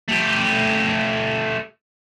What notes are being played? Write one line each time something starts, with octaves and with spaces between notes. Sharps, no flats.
A3 G4